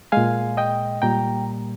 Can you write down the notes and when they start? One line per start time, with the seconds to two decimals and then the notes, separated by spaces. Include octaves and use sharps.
0.12 A#2 G#3 F5 G#5
0.57 D#5 G5
1.02 A#2 G3 A#3 G5 A#5